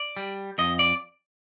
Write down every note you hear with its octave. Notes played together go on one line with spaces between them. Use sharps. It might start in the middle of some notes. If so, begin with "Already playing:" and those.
Already playing: D5
G3
F2 D#5
D5